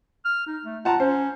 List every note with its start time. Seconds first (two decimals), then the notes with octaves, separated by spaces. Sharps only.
0.25 F6
0.47 D#4
0.65 A3
0.85 F4 F#5 A5 A#5
1.00 C#4 C5